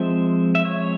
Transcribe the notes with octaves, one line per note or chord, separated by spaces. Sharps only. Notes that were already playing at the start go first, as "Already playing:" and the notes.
Already playing: F3 G#3 C4 E5
E5
C#5